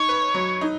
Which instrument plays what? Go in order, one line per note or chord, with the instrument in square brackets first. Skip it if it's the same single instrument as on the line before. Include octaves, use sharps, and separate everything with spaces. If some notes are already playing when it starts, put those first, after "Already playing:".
Already playing: [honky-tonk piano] D#4 [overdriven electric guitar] C#5
[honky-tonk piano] B4
F#3
D#4